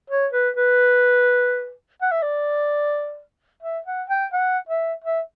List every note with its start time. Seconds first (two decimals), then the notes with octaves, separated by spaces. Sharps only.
0.10 C#5
0.33 B4
0.57 B4
2.02 F#5
2.12 E5
2.22 D5
3.63 E5
3.86 F#5
4.10 G5
4.33 F#5
4.69 E5
5.04 E5